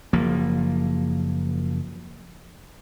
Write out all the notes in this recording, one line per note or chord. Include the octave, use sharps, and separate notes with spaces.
F#1 F3 A#3